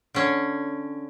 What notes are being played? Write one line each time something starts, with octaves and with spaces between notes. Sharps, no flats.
D3 C#4